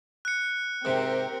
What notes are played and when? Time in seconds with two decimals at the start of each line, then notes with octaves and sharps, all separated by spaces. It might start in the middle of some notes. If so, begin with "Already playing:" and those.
0.25 F#6 C#7
0.85 G#2 C3 C4 G4 A#4